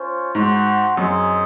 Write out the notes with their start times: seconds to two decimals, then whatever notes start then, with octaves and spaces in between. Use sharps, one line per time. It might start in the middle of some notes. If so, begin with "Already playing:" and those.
Already playing: C#4 F4 C5
0.35 G#2 F#4 C5 F#5
0.97 F#2 C4 D#4 G#4 D#5